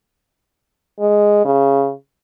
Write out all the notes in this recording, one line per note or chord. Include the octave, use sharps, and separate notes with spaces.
G#3
C#3